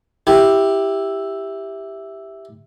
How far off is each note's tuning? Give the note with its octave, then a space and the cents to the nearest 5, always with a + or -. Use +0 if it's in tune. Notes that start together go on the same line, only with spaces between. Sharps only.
E4 +0 G4 +5